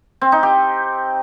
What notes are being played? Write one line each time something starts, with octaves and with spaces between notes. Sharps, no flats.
C4
D#4
G4